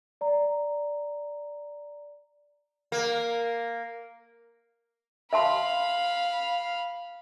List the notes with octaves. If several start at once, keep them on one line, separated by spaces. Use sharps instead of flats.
D5 A#5
A#3
E5 F5 A5 B5 C6